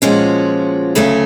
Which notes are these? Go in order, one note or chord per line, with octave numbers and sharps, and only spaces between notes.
A#2 F3 G#3 C#4 F#4
D2 C#3 F#3 A3 C#4